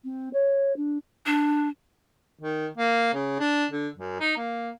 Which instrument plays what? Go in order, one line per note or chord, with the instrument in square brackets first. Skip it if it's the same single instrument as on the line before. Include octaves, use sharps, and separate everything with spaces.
[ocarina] C4
C#5
D4
[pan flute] D4
[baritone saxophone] D#3
A#3
C#3
D4
D3
F#2
D#4
A#3